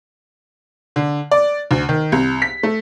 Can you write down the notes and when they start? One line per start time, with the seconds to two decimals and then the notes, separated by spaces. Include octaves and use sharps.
0.96 D3
1.31 D5
1.71 D2
1.89 D#3
2.12 C2
2.42 B6
2.63 A3